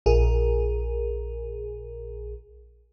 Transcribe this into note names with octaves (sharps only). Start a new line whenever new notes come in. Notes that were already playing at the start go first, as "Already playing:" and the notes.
A#1 G#4 A#4